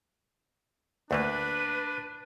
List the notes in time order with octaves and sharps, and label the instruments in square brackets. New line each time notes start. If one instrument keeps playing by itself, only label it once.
[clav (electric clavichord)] D2 A3 A#3 [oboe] D4 [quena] B4